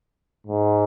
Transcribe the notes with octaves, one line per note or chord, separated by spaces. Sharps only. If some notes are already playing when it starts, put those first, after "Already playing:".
G#2